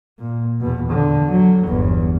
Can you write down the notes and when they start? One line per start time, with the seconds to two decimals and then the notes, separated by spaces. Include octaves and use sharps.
0.19 A#2
0.61 E2 B2
0.90 D3
1.31 F#3
1.64 G1 E2